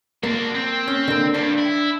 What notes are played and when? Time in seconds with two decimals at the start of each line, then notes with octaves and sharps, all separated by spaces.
0.23 A#3 D4 F#4
0.55 C4
0.88 C#4
1.08 D3 A#3
1.34 G2 D4
1.58 E4